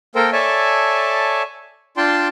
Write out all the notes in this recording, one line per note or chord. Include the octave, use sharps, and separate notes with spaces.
A#3 A4 A#4 C5 G5
A4 C#5 D5 E5 G#5 A5
D4 F4 D5 G5 A5 C6